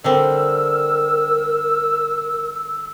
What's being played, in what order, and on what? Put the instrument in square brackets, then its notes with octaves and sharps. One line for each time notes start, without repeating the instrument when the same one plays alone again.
[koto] D3 G3 C4 [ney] A#4 [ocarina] E6